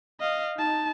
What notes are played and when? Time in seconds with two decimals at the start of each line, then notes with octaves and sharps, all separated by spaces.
0.20 D#5 F5
0.57 D#4 A5